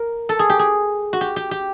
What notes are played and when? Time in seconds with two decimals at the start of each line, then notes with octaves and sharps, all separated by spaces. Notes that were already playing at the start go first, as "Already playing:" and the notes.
Already playing: A#4
0.29 A4
0.39 G#4
0.50 G4
0.59 G#4
1.13 F#4
1.21 G4
1.36 G4
1.51 G4